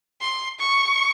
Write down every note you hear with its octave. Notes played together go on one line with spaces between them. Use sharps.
C6
C#6